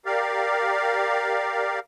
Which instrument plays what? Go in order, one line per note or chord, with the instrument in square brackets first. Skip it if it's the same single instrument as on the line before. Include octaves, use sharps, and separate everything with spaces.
[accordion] G4 A#4 D5 F5